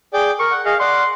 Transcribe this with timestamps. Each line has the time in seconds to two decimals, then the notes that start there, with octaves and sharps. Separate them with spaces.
0.13 G#4 D5 G5
0.40 A#4 C#6
0.51 F#5
0.66 G#4 D#5 F5
0.80 D5 F#5 C6